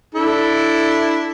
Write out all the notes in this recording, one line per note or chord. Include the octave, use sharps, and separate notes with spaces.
D4 E4 A4